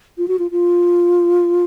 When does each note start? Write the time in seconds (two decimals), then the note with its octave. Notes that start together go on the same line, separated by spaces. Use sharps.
0.18 F4
0.28 F#4
0.39 F4
0.51 F4